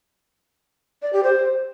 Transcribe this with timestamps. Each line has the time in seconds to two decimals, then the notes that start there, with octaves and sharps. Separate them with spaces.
1.02 D5
1.13 G4
1.23 C5